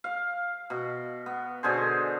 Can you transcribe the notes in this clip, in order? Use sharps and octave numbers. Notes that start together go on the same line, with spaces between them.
F5
B2
B3
B2 D3 G#4 C5